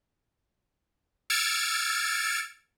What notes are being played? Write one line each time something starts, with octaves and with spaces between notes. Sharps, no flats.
E6 F6 G#6 A6 C#7 D7